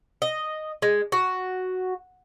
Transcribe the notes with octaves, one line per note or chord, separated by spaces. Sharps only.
D#5
G#3
F#4